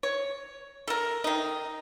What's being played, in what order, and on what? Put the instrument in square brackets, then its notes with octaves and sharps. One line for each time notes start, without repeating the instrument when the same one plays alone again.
[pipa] C#5
A4 A#4
D#3 D#4